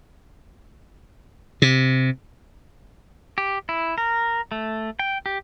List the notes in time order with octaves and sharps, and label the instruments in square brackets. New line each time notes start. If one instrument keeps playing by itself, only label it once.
[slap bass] C3
[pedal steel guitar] G4
E4
A#4
A3
G5
G4